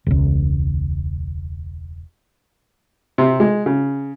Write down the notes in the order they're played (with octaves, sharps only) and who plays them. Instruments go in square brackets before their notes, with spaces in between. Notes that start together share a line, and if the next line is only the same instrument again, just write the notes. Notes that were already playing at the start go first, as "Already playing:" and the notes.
[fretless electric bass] E1 C#2
[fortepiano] C3
G#3
C#3